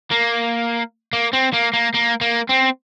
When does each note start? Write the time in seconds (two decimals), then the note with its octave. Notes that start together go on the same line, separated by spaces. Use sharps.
0.11 A#3
1.13 A#3
1.33 C4
1.54 A#3
1.74 A#3
1.95 A#3
2.21 A#3
2.49 C4